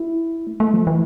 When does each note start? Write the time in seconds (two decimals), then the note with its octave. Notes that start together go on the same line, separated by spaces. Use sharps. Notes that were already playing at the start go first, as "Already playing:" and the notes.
Already playing: E4
0.47 A3
0.60 A3
0.74 F3
0.87 E3